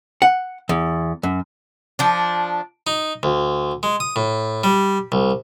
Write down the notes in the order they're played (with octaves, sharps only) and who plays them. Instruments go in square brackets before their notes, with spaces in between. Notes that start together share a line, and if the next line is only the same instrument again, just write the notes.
[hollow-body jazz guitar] F#5
E2
F#2
[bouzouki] F3 D4
[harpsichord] D#4
D2
G#3
D#6
A2
G3
C2